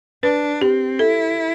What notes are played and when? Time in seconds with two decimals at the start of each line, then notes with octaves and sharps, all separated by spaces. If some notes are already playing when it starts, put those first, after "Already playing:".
0.23 D4 B4
0.62 C4 G4
0.99 E4 A4